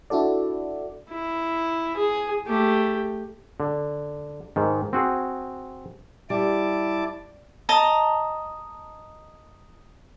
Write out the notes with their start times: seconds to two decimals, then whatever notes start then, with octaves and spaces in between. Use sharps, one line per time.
0.10 D4 E4 F#4 A4 D5
1.09 E4
1.96 G#4
2.46 A3 G4
3.60 D3
4.56 G#2 D#3
4.93 C4 F#4 G#4
6.30 G3 E4 A5 D6
7.69 D#5 A5 A#5